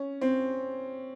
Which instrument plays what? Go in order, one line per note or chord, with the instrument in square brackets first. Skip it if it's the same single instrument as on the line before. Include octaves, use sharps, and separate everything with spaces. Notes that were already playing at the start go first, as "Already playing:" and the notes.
Already playing: [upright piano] C#4
C4